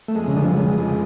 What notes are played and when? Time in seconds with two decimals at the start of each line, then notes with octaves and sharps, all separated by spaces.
0.08 A3
0.15 F2 G#3
0.28 C#3
0.35 F1 D3
0.42 F3
0.50 F#3
0.57 C#3 G#3
0.78 F3